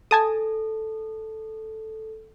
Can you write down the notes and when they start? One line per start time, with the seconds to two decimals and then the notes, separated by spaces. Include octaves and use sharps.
0.11 A4 G#5 A5 D#6